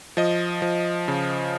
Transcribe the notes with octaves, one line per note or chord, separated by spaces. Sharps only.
F3 D#5
F3
C#3